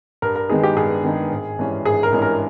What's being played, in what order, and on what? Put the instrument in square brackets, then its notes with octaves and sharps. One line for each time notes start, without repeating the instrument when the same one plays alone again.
[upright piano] G2 [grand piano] A#4
[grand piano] A#4
[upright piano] D#3 G#3 B3 D#4 [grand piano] G#4
[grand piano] G4
[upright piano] G2 [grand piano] G#4
[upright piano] D#3 G#3 B3 D#4
G#1
G2 E3 G#3 C#4
[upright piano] G#1 [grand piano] G#4
[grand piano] A#4
[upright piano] G2 E3 G#3 C#4
[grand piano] A#4